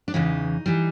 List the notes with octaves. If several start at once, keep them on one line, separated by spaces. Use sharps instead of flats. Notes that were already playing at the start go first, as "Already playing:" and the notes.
D4
E2 C#3 E3 D#4
E3 G3